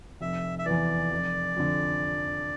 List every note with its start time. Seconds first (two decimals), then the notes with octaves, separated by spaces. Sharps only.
0.21 F1 E5
0.59 E5
0.66 E2 E3 D5
1.12 F1
1.56 F2 D3